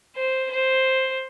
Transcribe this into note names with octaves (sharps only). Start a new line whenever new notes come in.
C5
C5